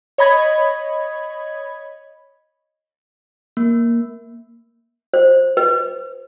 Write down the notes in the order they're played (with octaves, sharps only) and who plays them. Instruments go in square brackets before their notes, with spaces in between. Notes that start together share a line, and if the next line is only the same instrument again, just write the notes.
[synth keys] C#5 D#5 B5 G#6
[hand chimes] A#3
[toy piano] C5
B4